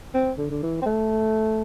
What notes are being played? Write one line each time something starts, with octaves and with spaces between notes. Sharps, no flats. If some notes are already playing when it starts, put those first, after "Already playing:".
C4
D3
D3
E3
C4
A3